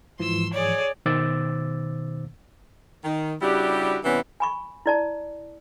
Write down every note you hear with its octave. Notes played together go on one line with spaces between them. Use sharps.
G#2 E3 F3 C6 E6
G#4 C#5 D5
B2 D#3 C5 D6 E6 A6
D#3
C#3 G3 D4 E4 F#4 G4
C3 E3 G3 B3 C#4
G#5 B5 C#6
E4 D5 A5